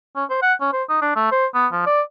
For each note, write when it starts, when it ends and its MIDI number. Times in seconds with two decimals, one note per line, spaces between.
0.16 0.24 61
0.30 0.42 72
0.42 0.54 78
0.61 0.69 61
0.73 0.83 72
0.89 0.99 63
1.02 1.12 62
1.16 1.28 57
1.31 1.46 72
1.54 1.67 59
1.72 1.82 53
1.86 2.01 74